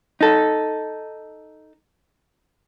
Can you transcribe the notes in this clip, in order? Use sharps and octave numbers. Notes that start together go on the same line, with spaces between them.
D#4 A4